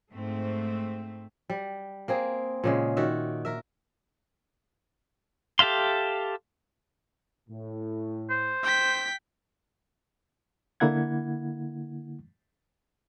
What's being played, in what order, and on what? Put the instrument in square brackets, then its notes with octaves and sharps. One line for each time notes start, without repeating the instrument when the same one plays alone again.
[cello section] G#2 A3 C4
[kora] G3
A#3 C4 G#4
A#2 C#3 G#3
D#3 F#4 E5
A#4 E5
[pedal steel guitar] G4 A4 E5 F5 C6
[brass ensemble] A2
[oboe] C5
[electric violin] G5 B6
[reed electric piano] D3 A#3 E4 F#5 G#6